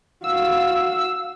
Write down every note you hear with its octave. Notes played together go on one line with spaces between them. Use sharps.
F#4 F5 E6